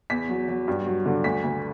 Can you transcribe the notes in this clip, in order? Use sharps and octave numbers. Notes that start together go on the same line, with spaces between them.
E2 B6
F#3
F#3
G2
F#3
D3
D2 B6
D2